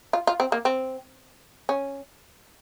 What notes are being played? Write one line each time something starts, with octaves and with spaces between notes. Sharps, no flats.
F4
F4
C4
A#3
C4
C#4